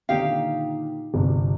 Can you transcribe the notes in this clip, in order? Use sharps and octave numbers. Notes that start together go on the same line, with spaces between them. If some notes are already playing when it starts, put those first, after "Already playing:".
A#2 D3 D#3 D#4 G4 F5
G1 C3